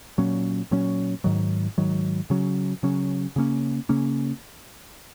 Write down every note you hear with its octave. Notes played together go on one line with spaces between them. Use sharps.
A#2 F#3 C#4
A#2 F#3 C#4
G#2 D#3 F#3
G#2 D#3 F#3
C#3 F#3 C#4
C#3 F#3 C#4
C#3 A#3 C#4
C#3 A#3 C#4